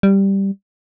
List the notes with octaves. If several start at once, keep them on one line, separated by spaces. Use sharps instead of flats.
G3